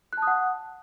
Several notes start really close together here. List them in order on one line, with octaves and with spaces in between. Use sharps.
F#6 A5 D#6 F#5